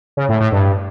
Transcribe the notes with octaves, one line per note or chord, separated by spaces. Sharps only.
C#3
A2
A2
G2